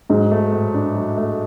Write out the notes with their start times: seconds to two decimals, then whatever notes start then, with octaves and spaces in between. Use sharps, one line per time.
0.10 G#2 F#3
0.31 A3
0.52 A2
0.74 D4
0.96 F#3
1.17 A3